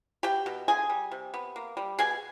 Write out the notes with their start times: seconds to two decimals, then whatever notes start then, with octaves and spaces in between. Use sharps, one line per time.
0.23 B2 G4 G5
0.46 B2
0.68 D3 G#4 G#5
0.90 G3
1.11 C3
1.34 B3
1.56 A#3
1.77 G3
1.99 B2 G#4 G#5